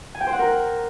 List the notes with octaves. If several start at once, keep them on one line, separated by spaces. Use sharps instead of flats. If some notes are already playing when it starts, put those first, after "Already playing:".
G#5
G5
C5
F#5
A#4